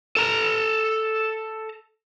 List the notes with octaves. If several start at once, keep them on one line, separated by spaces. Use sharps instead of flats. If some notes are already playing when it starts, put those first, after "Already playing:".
A4 A#5